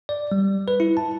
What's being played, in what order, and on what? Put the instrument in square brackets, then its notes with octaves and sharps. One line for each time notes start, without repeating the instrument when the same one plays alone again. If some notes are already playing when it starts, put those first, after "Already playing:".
[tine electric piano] D5
G3
B4
E4
A5